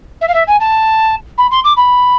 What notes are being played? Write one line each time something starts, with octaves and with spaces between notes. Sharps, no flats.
E5
F5
E5
G#5
A5
B5
C6
D6
B5